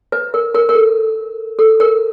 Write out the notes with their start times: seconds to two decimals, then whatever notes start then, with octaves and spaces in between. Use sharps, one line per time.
0.12 B4
0.34 A#4
0.55 A#4
0.69 A#4
0.75 A4
1.59 A4
1.80 A#4